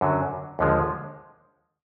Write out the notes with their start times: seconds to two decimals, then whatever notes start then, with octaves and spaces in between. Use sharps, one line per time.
0.01 F#2 D3 F#3
0.59 D#2 D3 F3 G#3